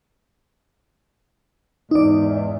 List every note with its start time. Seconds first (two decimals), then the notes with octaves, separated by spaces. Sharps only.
1.91 E2 G#2 D#4 D5